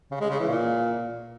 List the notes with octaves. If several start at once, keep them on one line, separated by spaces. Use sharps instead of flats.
C#3
G#3
C#3
E3
A#2